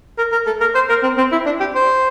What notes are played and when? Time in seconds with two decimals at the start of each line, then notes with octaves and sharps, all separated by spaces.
0.18 A#4
0.32 A#4
0.47 A4
0.61 A#4
0.75 C5
0.89 A#4
1.03 C4
1.18 C4
1.32 E4
1.46 D4
1.60 G4
1.75 C5